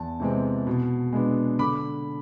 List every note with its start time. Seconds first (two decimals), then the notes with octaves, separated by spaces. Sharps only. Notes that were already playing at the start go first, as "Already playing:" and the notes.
Already playing: E2 A5
0.20 C3 E3 G#3 C4
0.67 B2
1.13 G#3 B3 D4
1.59 D3 B5 D6